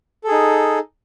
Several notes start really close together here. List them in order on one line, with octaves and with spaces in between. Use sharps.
A4 G#4 D#4